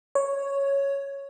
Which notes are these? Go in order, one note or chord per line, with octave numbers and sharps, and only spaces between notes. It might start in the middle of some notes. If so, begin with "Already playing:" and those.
C#5